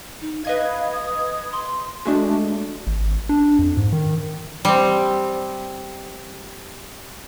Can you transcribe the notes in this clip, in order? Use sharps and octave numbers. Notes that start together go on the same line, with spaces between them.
D#4
B4 D#5 F5 G#6
D#6
C6
G#3 A3 D4 F#4
G#1
D4
F2
G#2
D#3
G3 C4